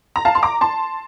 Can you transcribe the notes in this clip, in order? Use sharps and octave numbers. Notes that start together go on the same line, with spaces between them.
A#5
F5 A5
C6
A#5 D6
A5 C6